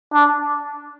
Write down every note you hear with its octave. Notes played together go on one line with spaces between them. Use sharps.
D4